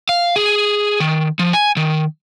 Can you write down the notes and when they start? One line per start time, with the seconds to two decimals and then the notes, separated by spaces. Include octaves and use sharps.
0.09 F5
0.36 G#4
1.00 D#3
1.39 F3
1.53 G#5
1.77 D#3